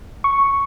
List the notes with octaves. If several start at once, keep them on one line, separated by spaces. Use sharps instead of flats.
C#6